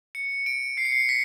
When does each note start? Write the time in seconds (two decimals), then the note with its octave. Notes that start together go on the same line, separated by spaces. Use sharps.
0.15 C#7
0.46 D7
0.77 C7
0.85 C#7
0.92 C7
1.09 B6